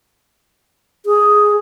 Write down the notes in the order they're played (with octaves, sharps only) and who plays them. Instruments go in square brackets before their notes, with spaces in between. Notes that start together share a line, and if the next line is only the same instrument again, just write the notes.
[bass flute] G#4